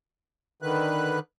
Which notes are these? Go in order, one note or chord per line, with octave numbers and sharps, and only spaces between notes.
D3 D#3 B4 F#6